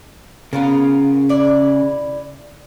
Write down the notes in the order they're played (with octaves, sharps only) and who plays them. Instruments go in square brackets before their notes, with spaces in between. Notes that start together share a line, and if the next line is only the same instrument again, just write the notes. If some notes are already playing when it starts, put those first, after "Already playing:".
[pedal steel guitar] C#3 [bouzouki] B3 F4 A#4
[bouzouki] E4 D5